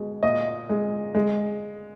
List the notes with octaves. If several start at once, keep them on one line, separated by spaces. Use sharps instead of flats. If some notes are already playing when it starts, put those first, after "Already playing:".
Already playing: B2 G#3
A#2 D#5
G#3
G#3